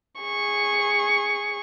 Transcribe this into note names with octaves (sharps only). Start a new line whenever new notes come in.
G#4 C#6